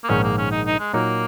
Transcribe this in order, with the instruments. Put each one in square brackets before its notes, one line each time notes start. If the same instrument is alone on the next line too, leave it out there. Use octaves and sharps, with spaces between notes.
[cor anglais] A#3
[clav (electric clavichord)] A#1 G#2 D#3 [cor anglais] C#4
[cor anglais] A#3
C#4
D#4
D#4
G#3
[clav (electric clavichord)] A#2 F#3 D#4 A#4 [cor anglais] A#3